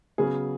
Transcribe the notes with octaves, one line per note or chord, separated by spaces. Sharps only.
C#3 F#3 B3 G#4